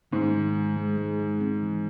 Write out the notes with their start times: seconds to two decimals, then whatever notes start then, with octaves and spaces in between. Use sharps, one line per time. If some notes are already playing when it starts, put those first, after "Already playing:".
0.12 G#2 D#3
0.33 D#3
0.55 G#3
0.76 G#3
0.97 G#3
1.20 G#3
1.40 C4
1.62 E3